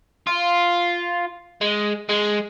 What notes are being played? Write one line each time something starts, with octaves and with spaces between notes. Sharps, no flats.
F4
G#3
G#3